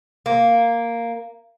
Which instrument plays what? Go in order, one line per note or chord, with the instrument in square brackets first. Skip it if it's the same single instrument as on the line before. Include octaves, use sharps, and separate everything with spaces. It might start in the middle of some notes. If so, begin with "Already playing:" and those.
[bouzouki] A#3